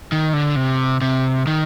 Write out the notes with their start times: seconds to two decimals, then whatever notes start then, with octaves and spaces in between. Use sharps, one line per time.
0.12 D#3
0.33 D3
0.56 C3
1.02 C3
1.47 D#3